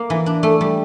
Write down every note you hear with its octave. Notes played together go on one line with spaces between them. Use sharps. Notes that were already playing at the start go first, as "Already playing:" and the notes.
Already playing: A#3
E3
D4
A3
G3